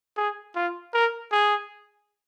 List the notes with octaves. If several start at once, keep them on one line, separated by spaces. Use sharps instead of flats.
G#4
F4
A#4
G#4